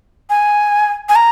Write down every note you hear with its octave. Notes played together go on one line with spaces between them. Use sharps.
G#5
G#5
A#5